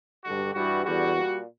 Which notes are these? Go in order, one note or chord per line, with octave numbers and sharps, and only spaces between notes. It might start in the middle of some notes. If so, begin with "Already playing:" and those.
G2 D3 G3 F#4
G2 E3 G3 F#4
E2 D3 G3 F#4
A#2 G3